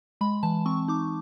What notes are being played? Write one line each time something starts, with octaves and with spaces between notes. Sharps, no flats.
G#3 B5
E3 A5
C4 C#6
D#4 D6